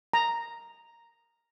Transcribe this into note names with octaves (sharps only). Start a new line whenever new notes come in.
A#5